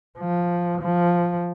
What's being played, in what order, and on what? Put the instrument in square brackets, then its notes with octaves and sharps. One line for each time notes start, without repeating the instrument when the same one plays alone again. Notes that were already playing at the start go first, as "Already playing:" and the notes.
[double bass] F3
F3